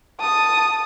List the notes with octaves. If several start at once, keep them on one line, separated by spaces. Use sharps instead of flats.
A5 D#6